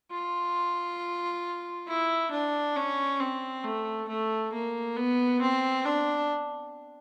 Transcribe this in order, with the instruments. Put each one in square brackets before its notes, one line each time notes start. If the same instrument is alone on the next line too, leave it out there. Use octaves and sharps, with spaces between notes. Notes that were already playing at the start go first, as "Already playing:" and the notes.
[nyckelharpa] F4
E4
D4
C#4
C4
A3
A3
A#3
B3
C4
D4